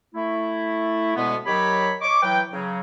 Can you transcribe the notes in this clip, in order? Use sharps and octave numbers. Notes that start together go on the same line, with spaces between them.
A3 E4
D2 B2 G#3 B3
D#3 F#3 G4 C#5 B5
C#5 D#5 C#6 D6
E3 F#3 B4 G5
C#3 F#3